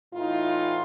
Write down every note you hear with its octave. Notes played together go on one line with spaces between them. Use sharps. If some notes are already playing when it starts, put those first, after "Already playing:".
A2 E3 D#4 F4